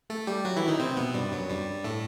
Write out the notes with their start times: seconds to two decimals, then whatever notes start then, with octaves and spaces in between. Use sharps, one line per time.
0.10 A3 A4
0.27 G3 G4
0.45 F#3 F#4
0.57 E3 E4
0.68 D#3 D#4
0.79 C3 C4
0.97 B2 B3
1.14 G2 G3
1.32 F#2 F#3
1.49 G2 G3
1.84 A2 A3